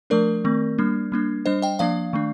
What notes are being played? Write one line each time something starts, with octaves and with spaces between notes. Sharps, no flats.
F3 A3 D4 A#4 D5
D#3 A3 C4
G3 A#3 D4
G3 A#3 D4
G3 D4 C5 D#5
D#5 G5
F3 A#3 D4 D5 F5
D#3 A3 D4